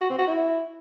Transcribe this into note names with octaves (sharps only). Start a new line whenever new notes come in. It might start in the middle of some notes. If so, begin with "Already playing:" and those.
F#4
C4
F#4
E4